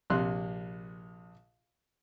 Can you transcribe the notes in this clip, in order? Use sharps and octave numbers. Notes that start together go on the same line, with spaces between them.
A#1 C3 C6 F#6